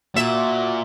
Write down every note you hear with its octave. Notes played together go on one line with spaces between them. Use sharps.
A#2 F#4 E5